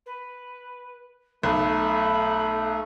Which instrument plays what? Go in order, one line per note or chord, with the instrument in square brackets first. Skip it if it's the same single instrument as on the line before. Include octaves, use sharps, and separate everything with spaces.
[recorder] B4
[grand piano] B1 [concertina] A3 [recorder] B5